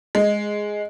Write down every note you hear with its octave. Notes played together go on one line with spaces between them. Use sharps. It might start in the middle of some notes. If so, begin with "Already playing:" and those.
G#3